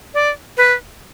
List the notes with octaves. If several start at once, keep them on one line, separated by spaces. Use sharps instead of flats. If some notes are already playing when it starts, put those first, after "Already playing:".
D5
B4